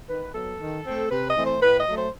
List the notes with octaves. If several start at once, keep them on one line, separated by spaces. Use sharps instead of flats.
D#3 B4
F#3 B3 A4
D#3
A3 C4
C3 B4
D#5
E3 A3 C4
C5
A2 B4
D#5
F#3 A3
C5